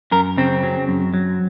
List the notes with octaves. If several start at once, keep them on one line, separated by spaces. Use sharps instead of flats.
F#2 A#4
C#3 C4
F#3
F#2
F#3